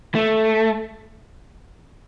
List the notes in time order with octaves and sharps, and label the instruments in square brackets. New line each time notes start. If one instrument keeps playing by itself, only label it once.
[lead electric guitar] A3